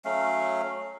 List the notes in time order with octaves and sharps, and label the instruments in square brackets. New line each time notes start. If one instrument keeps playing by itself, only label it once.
[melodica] F#3 A3 C#4 F5